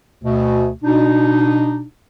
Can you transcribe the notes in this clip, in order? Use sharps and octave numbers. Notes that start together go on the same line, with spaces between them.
D2 B2 A3
B2 D4 D#4